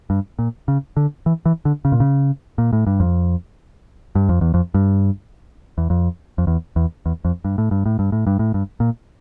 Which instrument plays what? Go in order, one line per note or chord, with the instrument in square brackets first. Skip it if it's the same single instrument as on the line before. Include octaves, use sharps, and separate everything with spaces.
[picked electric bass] G2
A#2
C#3
D3
E3
E3
D3
C#3
A#2
C#3
A#2
A2
G2
F2
G2
F2
E2
F2
G2
E2
F2
F2
E2
E2
E2
F2
G2
A2
G2
A2
G2
A2
G2
A2
G2
A#2